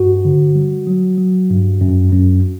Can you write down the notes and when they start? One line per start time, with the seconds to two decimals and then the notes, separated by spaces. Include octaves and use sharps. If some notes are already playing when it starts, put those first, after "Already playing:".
Already playing: G2 F#4
0.25 D3
0.55 G3
0.87 F#3
1.18 F#3
1.50 G2
1.81 F#2
2.12 F#2